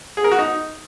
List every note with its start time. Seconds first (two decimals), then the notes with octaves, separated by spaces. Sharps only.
0.17 G#4
0.24 A#4
0.31 F#4
0.39 D#4